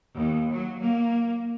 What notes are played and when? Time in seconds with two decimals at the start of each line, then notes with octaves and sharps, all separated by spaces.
0.15 D#2
0.51 F#3
0.80 A#3